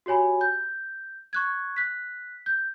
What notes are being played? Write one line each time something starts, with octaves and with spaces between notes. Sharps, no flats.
F#4 G4 C#5 G#5 B5
G6
C#6 F#6 G#6
F#6 B6
G6